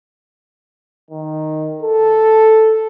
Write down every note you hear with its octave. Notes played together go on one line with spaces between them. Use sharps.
D#3
A4